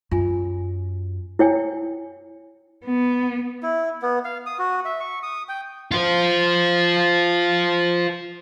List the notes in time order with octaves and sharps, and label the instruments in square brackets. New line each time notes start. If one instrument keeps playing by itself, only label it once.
[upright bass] F#2 [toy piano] F4 G#5
[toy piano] E4 C#5 G5 G#5
[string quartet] B3
[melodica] E4
B3
F5
D#6
F#4
E5
C#6
D#6
G5
[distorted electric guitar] F4 C5